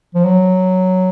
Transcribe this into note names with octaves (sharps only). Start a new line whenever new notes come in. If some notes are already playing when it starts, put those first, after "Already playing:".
F3
F#3